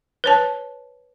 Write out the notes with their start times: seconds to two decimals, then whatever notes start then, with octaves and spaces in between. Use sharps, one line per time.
0.24 B4 C#5 A5